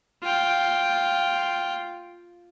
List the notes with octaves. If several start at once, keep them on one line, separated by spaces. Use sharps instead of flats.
F4 G5